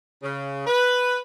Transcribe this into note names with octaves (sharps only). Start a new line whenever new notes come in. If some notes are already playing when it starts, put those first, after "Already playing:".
C#3
B4